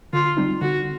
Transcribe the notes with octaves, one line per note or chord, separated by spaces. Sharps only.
D3 F4
G3 C4 D#4
D3 F#4